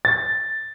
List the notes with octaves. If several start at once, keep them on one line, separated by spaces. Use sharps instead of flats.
A6